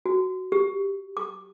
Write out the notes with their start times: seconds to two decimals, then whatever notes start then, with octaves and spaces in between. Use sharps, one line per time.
0.06 F#4
0.52 G4
1.17 D6